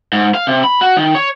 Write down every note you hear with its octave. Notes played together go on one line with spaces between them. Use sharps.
G#2
F5
C3
B5
F#4
D#3
C#5